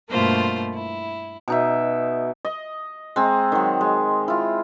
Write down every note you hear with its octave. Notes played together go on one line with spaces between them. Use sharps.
G2 B2 A3 A#3 F4 C5
E4
B2 D#4 E5
D#5
G#3 C4 A#5
D#3 F#3
G#3
E4 F4